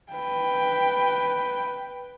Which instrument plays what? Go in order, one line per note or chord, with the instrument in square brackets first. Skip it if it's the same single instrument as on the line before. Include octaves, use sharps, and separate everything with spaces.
[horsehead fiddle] B4 G5